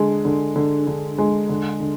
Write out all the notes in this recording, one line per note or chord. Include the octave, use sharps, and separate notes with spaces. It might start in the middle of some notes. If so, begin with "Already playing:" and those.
Already playing: D3 G#3
D3
D3
D3
G#3
D3
D3